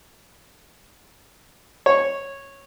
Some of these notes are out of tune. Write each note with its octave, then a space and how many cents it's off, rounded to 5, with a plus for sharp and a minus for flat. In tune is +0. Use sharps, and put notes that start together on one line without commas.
C#5 -10